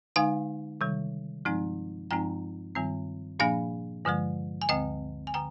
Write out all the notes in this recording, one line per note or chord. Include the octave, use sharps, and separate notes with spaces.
D3 G#3 D#4 F5 G#5
C3 D#3 G3
G2 F3 G#3 C4 D#4
G2 F3 G#3 C4 D#4 G5 A#5
G2 D#3 G3 C4
A#2 F3 A#3 D4 F5 G#5
G2 D3 F3 G#3
G#5
D2 D3 G#3 C4 D#5 G5
G#5
D3 G5 A#5